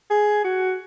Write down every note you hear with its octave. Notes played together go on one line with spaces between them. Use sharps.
G#4
F#4